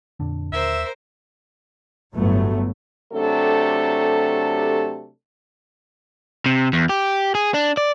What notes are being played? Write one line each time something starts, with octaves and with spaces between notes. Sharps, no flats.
F2 A#2 D3 D4
D#2 A#4 C5 E5
G1 A2 F#3 A3 B3
C3 F#3 A3 D4 G4 A4
C3
E2
G4
G#4
D4
D5